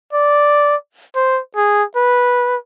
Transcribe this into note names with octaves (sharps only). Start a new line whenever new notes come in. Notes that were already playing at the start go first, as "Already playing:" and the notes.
D5
C5
G#4
B4